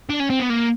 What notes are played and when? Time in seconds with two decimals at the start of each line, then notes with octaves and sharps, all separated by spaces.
0.09 D4
0.20 C#4
0.30 C4
0.40 B3
0.50 A#3